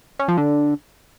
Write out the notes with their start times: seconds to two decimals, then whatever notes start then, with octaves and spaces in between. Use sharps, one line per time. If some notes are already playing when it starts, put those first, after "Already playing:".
0.19 C#4
0.28 F3
0.37 D3